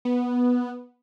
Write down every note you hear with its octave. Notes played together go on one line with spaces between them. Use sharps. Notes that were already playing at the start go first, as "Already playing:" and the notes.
B3